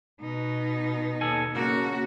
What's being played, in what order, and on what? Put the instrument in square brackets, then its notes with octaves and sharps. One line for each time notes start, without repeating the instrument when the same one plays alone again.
[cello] B2 D#4
[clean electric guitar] D#2 A4 G#5
[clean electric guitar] C#3 A#3 [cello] C#4 F#4